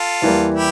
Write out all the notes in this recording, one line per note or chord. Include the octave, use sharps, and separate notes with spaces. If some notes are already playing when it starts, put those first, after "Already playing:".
Already playing: F4 A4
E2 E3 G3 A#3
E4 G4